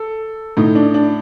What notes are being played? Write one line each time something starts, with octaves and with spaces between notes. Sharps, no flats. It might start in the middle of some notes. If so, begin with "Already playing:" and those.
Already playing: A4
A2 D#4
D4
D4